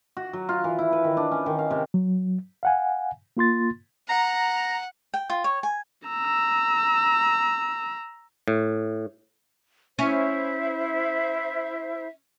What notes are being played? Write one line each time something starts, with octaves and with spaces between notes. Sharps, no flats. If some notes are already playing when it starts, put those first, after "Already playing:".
F#4
F#3
F4
E3
E4
B4
D#3
D4
C#4
D#3
F5
C3
F#3
F5 F#5 G#5
A#3 F4 C6 A6
F#5 A#5
G5
F4
C#5
G#5
A#5 E6
A2
C#4 E4 C5 E5